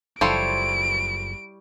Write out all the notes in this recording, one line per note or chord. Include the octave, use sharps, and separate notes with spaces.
F#1 F3 G3 E4 A4 C5 C#5 D7